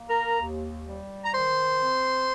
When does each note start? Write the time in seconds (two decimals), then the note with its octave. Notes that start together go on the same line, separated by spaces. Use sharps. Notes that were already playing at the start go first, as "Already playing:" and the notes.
Already playing: A#3
0.09 A#4 A#5
0.41 D#2
0.87 G3
1.25 A#5
1.33 D#3 C5 C6
1.80 C4